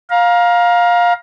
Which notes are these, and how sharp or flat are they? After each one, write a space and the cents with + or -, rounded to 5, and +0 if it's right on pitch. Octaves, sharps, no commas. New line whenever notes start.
F5 +15 A#5 +25